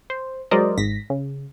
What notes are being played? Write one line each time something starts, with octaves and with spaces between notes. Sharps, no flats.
C5
F#3 G#3 A#4 C5 D5 D#5
G#1 G#2 A#6 B6
C#3